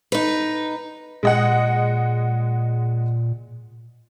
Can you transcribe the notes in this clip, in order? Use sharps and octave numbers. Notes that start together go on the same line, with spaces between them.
D#4 B4
A#2 G#3 D#5 F#5